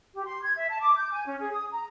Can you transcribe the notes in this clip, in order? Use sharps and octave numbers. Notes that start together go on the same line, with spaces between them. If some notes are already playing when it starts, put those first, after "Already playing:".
G4
C6
G#6
E5
A5
D6
G6
G#5
C#4
G#4
D#6
A#5